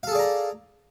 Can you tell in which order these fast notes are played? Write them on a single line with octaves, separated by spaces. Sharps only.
F5 A4 G#4 D5 A#5